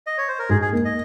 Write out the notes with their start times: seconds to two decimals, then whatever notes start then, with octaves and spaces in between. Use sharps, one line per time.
0.07 D#5
0.18 C#5
0.28 C5
0.39 A#4
0.49 G#2 G#4
0.62 G#4
0.73 A#3
0.85 D#5